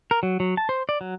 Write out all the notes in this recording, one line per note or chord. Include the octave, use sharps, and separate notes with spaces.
A#4
F#3
F#3
A5
C5
D5
F#3